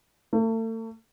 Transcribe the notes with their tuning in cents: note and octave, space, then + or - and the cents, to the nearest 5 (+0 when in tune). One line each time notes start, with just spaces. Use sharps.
A3 +40